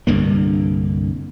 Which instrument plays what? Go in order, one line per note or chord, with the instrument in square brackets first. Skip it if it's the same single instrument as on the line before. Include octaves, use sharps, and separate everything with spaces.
[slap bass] C2 G2 D3 A#3